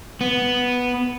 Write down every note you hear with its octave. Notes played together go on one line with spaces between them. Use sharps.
B3